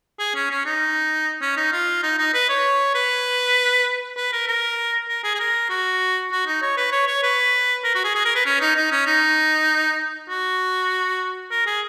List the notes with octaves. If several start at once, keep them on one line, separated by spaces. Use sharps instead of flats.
G#4
C#4
C#4
D#4
C#4
D#4
F4
D#4
D#4
B4
C#5
B4
B4
A#4
A#4
A#4
G#4
G#4
A#4
F#4
F#4
D#4
C#5
B4
C#5
C#5
B4
A#4
F#4
G#4
G#4
A#4
B4
C#4
D#4
D#4
C#4
D#4
F#4
A#4
G#4